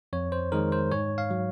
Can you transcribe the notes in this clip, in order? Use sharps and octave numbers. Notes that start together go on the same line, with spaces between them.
F2 C#5
C5
D#3 G#3 A#4
C5
G#2 C#5
F5
F#3